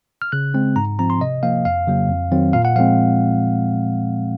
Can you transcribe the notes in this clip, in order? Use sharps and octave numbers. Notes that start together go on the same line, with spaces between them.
F6
C#3 F#6
G#3 C4
G#2 A#5
F3 C4 A#5
C6
C3 D#5
F3 A#3 F5
F2 F5
C#3 F#3 A#3
F2
D#3 F#3 C4
A#2 F5
F#5
F3 G#3 C4 F5